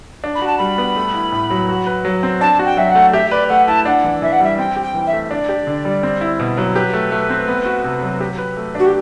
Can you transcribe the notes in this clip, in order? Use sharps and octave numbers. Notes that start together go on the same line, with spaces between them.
D4
B5
F#4 A5
G3 B5
B3
A3
E4
A2
F#3
F#4
B4
F#3
C4
D4 A5
F#4
G5
F#3 E5
F#5
A3
G4 E5
B4 D5
A3 F#5
E4 A5
D4 F#5
E3
E3 E5
F#5
G3 E5
C4 G5
G4
G5
E3
E5
A3
D4 D5
G4
D3
G3
C4
E4
B2
F#3
G4 B4
A3
A3
C4
B3
F#4
C3
F#3
G4
B4
A3
D4 F#4
G4